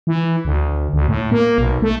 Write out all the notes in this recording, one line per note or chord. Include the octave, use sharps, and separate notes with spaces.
E3
D2
D2
A2
A#3
B1
A3